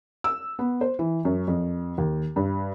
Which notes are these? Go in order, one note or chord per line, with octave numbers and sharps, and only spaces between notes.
E6
B3
C5
E3
F#2
F2
D#2
G2